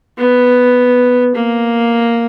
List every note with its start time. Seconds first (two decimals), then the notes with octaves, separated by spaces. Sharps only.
0.18 B3
1.34 A#3